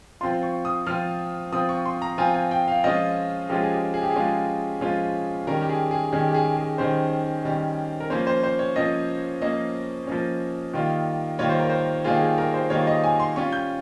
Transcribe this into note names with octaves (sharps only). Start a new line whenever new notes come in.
F3 C4 F4 C6
C#6
D#6
F3 C4 F4 F6
F3 C4 F4 D#6
C#6
C6
A#5
F3 C4 F4 G#5
G#5
G5
F5
F3 G#3 C#4 F4 D#5
F3 G#3 C#4 F4 G4
G#4
G4
G#4
G4
G#4
F3 G#3 C#4 F4
F3 G#3 C#4 F4
D#3 G3 C#4 A#4
G4
G#4
G#4
D#3 G3 C#4 G#4
G4
G#4
G#4
D#3 G3 C#4 C5
D#3 G3 C#4
A#4
F3 A#3 C#4 C5
C5
C5
C#5
F3 A#3 C#4 D#5
F3 A#3 C#4 D#5
F3 A#3 C#4
D#3 G3 A#3 F4
D#3 G3 A#3 F4 C#5
C5
A#4
C5
D#3 G3 A#3 F4 G#4
G#4
A#4
C5
D#3 G3 A#3 F4 C#5
D#5
G#5
C6
G3 C#4 F4 C#6
G6